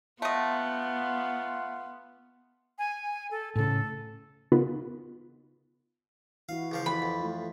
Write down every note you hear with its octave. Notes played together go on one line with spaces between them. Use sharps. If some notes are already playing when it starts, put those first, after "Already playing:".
A3 B3 F4 D#5 F#5
G#5
A4
A2 C#3 A4
C#3 B3 D#4 F4 A#4 B4
E3 E4 F#4 F5
C#2 F3 F5
F2 E3 F#4 B5
F2
A3 F4